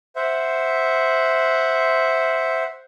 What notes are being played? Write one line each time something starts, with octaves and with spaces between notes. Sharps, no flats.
C5 E5 F#5